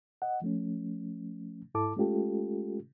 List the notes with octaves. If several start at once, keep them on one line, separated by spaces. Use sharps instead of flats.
D#5 F#5
F3 A3 C#4
G#2 E4 A4 A5 D6
G#3 A3 C#4 F4 G4 A4